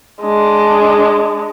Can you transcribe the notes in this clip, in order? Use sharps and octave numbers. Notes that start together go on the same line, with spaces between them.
G#3 D4